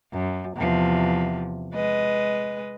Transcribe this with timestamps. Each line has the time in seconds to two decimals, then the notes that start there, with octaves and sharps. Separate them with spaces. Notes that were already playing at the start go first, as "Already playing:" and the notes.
0.13 F#2
0.57 E2 C3 F3
1.74 G#3 B4 D#5